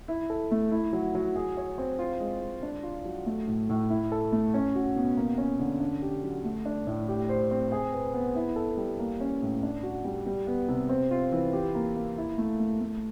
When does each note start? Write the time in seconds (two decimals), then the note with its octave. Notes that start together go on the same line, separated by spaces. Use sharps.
0.08 E4
0.30 A4
0.51 A3
0.72 E4
0.93 F#3
1.15 F#3
1.36 G#4
1.57 C#5
1.78 C4
1.99 F4
2.20 G#3
2.41 G#3
2.63 D4
2.83 F4
3.05 F#3
3.26 A3
3.48 A2
3.69 A2
3.90 E4
4.12 A4
4.32 A3
4.54 C#4
4.75 F#4
4.96 B2
5.17 A#3
5.38 C#4
5.60 D3
5.80 D4
6.02 G4
6.23 F#3
6.45 A3
6.65 D4
6.87 A2
7.08 G4
7.29 C5
7.51 C4
7.72 G#4
7.93 B4
8.14 B3
8.35 E4
8.56 A4
8.77 G3
8.99 A#3
9.20 C#4
9.42 A2
9.63 D4
9.83 F#4
10.04 G3
10.26 G3
10.47 B3
10.69 C3
10.89 C4
11.11 F4
11.32 E3
11.53 G4
11.75 A#3
11.96 A#3
12.18 E4
12.38 A3
12.59 A3
12.81 A3